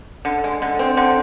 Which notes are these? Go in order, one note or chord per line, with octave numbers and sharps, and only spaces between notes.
D3
G#3
D3
C4
D3